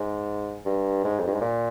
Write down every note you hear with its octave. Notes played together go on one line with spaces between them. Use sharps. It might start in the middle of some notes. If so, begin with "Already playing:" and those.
Already playing: G#2
G2
G#2
F2
G2
G#2
A#2